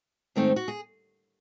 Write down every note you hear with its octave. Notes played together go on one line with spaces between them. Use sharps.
G#2 D#3 A3 C4
F#4
G#4